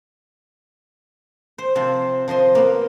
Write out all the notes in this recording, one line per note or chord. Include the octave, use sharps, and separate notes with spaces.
C5
C3 F3 C5
F3 C5 D#5 C6
A#3 B3